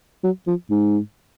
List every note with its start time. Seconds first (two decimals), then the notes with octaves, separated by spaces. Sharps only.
0.24 F#3
0.47 F3
0.70 G#2